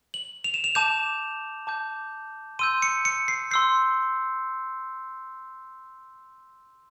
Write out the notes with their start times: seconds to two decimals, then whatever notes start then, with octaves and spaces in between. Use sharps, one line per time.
0.14 F#7
0.44 F7
0.54 E7
0.64 F7
0.75 A5 D6 G6 E7
1.67 A5 D6 G6
2.59 C6 E6 G6 D#7
2.82 C#7
3.05 C#7
3.28 C7
3.51 C6 E6 G6 C7